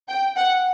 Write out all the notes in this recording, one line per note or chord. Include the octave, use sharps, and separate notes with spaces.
G5
F#5